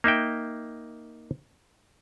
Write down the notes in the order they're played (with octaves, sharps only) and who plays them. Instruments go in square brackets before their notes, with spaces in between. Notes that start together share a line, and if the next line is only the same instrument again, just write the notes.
[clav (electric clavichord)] A#3 D#4 E5 G5